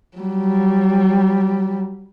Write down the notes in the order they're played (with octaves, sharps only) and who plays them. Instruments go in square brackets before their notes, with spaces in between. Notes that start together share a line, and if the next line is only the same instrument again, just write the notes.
[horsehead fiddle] F#3 G3